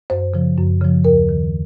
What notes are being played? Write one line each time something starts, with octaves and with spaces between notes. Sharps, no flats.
F#2 C5
C#3 F3
F#2
C#3 F3
D#2 A#4
D#3